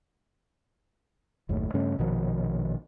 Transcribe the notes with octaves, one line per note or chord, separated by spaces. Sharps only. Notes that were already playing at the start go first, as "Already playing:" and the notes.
F#1 D#2 A2
G2 C#3 A3 C#4
A#1 B2 D#3 F3